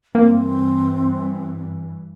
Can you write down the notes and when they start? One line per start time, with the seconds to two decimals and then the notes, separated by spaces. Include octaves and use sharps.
0.15 G2 E3 A#3 C4